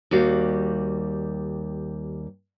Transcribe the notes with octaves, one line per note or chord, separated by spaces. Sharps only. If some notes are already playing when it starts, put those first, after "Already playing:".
D#2 G3 F#4 F5